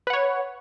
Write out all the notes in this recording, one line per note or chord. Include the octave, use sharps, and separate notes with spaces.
B4 C#5 F#5